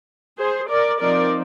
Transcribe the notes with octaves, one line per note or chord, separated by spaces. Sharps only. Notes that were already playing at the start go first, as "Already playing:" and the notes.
G#4 C5
A#4 D5
F3 C4 D#4 A#4 D5